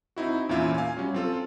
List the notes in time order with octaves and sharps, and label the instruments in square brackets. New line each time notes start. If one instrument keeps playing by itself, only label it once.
[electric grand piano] C4 D#4 E4 F#4
E2 A#2 C#4 E4 F4 E5
F5 G#5
F#3 G3 C#4
C4 F4 A4